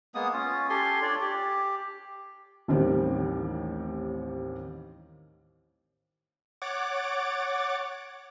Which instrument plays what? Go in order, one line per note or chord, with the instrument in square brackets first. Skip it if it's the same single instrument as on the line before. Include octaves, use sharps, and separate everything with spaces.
[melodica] G#3 A#3 B3 D#6
C#4 F4
G4 A4 G#5 C6
D4 F4 C#5 D5
G4
[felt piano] A1 D#2 D#3 G3 C4 G4
[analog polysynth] C#5 F#5 D6 A6